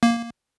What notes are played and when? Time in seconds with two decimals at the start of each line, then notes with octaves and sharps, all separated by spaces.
0.03 A#3